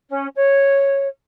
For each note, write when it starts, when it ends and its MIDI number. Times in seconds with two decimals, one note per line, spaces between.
0.09 0.27 61
0.36 1.07 73